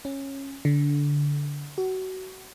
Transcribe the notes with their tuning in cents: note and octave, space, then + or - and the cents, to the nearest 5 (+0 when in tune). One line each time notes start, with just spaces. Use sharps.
C#4 -15
D3 -20
F#4 +25